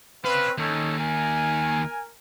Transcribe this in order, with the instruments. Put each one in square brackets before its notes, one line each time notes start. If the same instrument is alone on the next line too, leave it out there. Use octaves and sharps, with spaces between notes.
[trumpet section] C4 B4 [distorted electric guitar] C#4 F5
[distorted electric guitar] D#2 [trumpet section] C#4 D#4 A4
[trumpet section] A#4 G#5